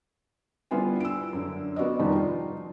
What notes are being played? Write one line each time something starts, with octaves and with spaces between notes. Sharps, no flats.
D3 G3 B3 E4 F4 G#5
E6 D7
F#2 D3
B3 F#4 D5 D#5
F1 D#3 F3 G3 D#4
F4